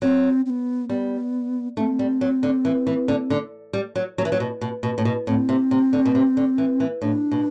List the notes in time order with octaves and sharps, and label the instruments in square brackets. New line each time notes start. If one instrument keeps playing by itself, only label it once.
[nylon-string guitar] F#3 [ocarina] C4
[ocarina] C4
B3
[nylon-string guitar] G3 [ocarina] B3
[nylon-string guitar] A3 [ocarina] D4
[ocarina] C4
[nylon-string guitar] G3
F#3
D3
E3
E3
D3
D3
G3
F#3
F#3
E3
F#3
B2
B2
B2
A2
B2
[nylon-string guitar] A2 [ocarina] C4
[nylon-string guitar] C3
C3
D3
B2
C3
D3
E3
E3
[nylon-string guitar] A2 [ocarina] D4
[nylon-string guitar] B2